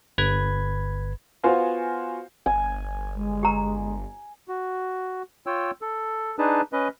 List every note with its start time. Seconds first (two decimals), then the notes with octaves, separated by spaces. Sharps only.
0.18 G1 B4 B5 G#6
1.44 B3 F4 F#4 C5 F5 G#5
2.46 G1 G#5
3.16 G#3
3.43 G4 A#5
4.48 F#4
5.46 F4 C#5 G5 E6
5.82 A4
6.39 D4 D#4 G#4 B4 A5
6.73 C#4 B4 D#5